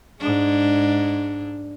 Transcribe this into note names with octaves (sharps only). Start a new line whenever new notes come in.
G#2 G#3 D4